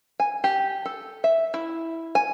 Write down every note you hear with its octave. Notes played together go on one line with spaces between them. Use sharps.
G#5
G4
A4
E5
E4
G#5